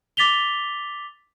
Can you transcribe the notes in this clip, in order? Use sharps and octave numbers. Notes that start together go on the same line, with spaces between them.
D6 A6 B6 F7 G7